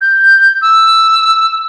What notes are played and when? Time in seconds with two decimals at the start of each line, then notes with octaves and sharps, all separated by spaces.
0.01 G6
0.62 E6